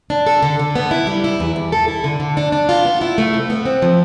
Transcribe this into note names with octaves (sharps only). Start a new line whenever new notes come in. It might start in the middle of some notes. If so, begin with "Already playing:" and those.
D4
A4
D3
D3
B3
E4
G3
E4
E2
E2
A4
E4
D3
D3
D4
D4
F4
B3
E4
A3
C3
B3
C4
F3